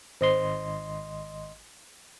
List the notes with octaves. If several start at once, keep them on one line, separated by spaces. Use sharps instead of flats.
G#1 C5 D#5 C6